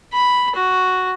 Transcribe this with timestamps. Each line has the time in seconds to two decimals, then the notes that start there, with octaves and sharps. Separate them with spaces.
0.13 B5
0.56 F#4